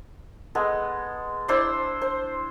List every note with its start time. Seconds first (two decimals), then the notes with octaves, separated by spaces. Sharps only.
0.55 G#3 B3 A4
1.48 D4 E4 C5 E6
2.01 C5